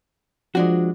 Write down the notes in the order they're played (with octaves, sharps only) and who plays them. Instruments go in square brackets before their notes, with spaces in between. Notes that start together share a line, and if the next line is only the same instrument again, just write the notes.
[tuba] F3 [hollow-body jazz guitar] G#3 D4 F#4